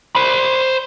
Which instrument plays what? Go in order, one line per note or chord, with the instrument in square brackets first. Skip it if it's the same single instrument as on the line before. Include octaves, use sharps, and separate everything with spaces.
[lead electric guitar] C5 B5